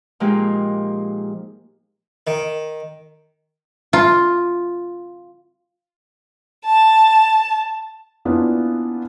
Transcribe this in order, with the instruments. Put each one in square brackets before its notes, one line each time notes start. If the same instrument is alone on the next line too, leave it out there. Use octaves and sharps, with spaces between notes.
[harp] A#2 F3 G#3 A#3 D#4 G4
[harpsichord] D#3
[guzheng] F4
[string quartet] A5
[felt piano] A#3 B3 C#4 D4 E4 F4